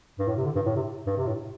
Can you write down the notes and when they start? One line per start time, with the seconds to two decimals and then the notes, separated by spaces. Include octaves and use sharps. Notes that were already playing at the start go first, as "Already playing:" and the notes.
0.19 G2
0.28 A2
0.37 C3
0.46 D3
0.56 G2
0.66 A2
0.76 C3
1.07 G2
1.17 C3
1.27 A2